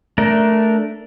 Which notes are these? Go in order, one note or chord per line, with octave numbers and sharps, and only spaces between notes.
A3 D4 A#4